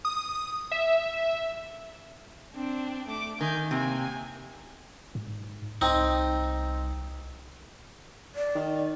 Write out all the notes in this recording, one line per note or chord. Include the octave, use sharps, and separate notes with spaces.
D#6
E5
C4 D4
A3 D6
D#3 G#5 G6
C3 A#3 G#5
G#2
C2 C4 D#4
D5
D#3